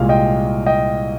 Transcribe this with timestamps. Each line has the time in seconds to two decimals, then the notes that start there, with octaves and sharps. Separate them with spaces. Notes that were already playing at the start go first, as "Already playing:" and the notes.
Already playing: C2 A#2 G#3 F5
0.09 D#5 G5
0.66 D#5 G5